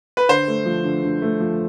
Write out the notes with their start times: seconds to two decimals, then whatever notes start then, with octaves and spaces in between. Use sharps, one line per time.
0.17 B4
0.29 D3 C5
0.48 A3
0.66 F3
0.84 D3
1.03 D3
1.22 A3
1.40 F3